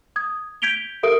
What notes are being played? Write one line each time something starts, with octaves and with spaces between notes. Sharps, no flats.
D#6 G#6
G6 G#6 B6 D7 F7 G7
G4 A4 A#4 E5 D#6 D7